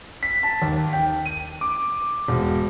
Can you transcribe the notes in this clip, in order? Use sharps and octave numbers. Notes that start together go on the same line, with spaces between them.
B6
A5
D#2
G5
D#7
D6
E1